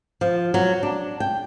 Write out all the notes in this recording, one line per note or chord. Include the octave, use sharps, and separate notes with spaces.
F3
F#3
D4
G5